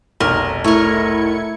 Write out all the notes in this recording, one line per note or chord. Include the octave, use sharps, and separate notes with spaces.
F1 B1 A#4
A3 E4 A#4 C#5 G#6 C#7